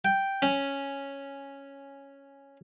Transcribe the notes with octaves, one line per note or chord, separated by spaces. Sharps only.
G5
C#4